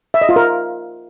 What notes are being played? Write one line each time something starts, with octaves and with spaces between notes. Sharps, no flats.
E5
D#5
F4
A#4